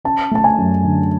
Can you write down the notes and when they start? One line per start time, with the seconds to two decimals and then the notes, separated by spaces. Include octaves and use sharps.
0.04 C#4 A5
0.31 A3 A5
0.44 G#5
0.58 F#2
0.84 D3